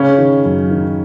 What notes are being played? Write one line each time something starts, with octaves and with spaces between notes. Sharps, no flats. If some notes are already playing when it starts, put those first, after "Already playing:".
Already playing: C#3 C#4
D#3
F#2
D#3